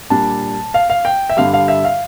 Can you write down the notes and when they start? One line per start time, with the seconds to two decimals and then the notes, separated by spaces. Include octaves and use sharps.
0.10 A#2 G3 D4 A5
0.74 F5
0.90 F5
1.05 G5
1.30 E5
1.37 G2 D3 G3 F5
1.54 F5
1.68 E5
1.84 F5